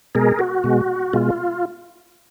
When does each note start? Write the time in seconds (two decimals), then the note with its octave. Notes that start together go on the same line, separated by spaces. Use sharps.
0.15 B2 G#3 G#4 A#4
0.39 F#4
0.64 B2 G#3
1.13 B2 G#3 F4